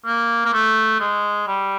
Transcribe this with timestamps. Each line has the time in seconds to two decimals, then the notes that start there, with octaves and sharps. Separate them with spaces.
0.06 A#3
0.45 A#3
0.53 A3
1.00 G#3
1.48 G3